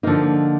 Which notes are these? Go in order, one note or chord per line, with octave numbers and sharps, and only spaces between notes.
D3 F3 A#3 D#4